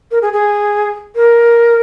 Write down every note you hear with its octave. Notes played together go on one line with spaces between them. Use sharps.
A#4
G#4
G#4
A#4